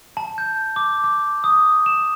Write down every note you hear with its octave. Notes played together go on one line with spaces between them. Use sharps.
A5
G6
D6
D6
D#6
E7